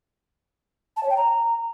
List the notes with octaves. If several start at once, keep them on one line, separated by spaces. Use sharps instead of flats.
A5
C#5
G5
A#5